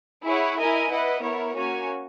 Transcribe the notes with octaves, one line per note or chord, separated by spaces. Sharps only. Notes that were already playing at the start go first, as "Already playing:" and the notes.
E4 G#4 C#5 F#5
E4 A#4 D#5 G#5
E4 B4 D#5 F#5
B3 E4 A#4 C#5
A#3 C#4 F#4 C#5 G#5